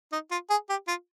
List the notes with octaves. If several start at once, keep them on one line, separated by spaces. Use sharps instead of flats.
D#4
F4
G#4
G4
F4